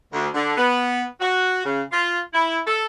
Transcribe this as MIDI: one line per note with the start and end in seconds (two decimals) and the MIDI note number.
0.13 0.28 38
0.34 0.57 50
0.57 1.04 59
1.21 1.63 66
1.65 1.82 49
1.92 2.19 65
2.34 2.59 64
2.67 2.86 69